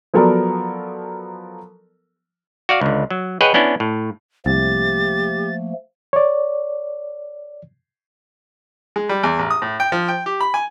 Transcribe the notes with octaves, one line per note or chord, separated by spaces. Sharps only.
F3 F#3 B3 A4 A#4 D5
F#4 D5 F5
C#2 D3
F#3
G#4 B4 C#5 D#5 F#5 G5
B3 C#4 D4 E4
A2
C2 F3 A3 A#3 G4 A6
C#5 D5
G#3
G3
E2
A1
D#6
A2
G5
F3
G5
G4
B5
G#5